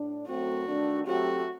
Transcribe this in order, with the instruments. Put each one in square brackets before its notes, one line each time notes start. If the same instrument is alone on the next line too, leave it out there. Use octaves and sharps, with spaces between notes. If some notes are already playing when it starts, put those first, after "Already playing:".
Already playing: [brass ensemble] A2 D4
[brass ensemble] F#2 F#3 A3 C4 [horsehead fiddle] F#4
[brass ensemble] D#3 A3 D4
[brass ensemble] F#3 A3 C4 G4 [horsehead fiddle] F#4